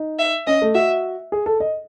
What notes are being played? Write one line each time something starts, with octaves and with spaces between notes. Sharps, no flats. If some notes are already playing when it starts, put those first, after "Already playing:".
Already playing: D#4
E5
C#4 D#5
A3
F#4 E5
G#4
A4
D#5